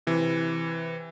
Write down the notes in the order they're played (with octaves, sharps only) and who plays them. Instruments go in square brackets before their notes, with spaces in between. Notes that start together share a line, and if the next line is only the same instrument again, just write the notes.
[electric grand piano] C3 E3